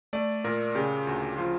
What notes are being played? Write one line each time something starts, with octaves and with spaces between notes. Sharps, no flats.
A3 D5
A#2 A#4
C#3 G4
D2
F3 F4